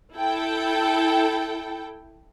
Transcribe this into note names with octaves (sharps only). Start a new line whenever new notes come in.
E4 A4 G5